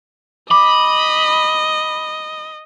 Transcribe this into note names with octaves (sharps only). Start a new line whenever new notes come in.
D#5 B5 D6